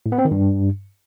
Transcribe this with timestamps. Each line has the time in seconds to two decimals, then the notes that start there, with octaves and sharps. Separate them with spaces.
0.06 A2
0.12 B3
0.18 C4
0.25 D#3
0.31 G2